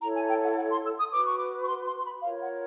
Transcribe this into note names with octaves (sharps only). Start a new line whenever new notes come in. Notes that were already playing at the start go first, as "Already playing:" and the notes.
E4 A4 C#5 A#5
G#5
G5
F#5
F#5
C6
E6
D#6
F#4 B4 D6
C#6
D6
C#6
C6
C6
C6
B5
F4 A#4 C#5 F5
F#5